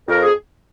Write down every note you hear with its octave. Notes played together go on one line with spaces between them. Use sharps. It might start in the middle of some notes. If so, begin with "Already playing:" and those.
F2 A#4
G#4